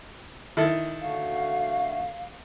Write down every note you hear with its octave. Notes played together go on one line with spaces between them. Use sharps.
D#3 E4 A4
D3 A3 F#4 F5